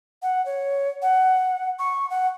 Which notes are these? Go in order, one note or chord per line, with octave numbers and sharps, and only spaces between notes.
F#5
C#5
F#5
C#6
F#5